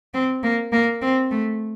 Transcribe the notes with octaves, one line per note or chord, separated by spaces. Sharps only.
C4
A#3
A#3
C4
A3